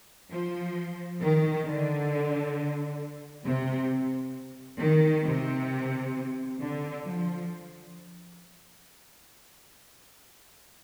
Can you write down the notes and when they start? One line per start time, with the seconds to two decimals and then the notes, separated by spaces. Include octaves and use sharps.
0.31 F3
1.21 D#3
1.66 D3
3.45 C3
4.80 D#3
5.25 C3
6.60 D3
7.05 F3